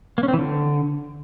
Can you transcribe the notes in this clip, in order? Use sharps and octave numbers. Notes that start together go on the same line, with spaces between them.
A#3
C#4
C4
E3
D3